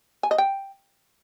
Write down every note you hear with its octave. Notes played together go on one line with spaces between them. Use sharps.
G#5
D#5
G5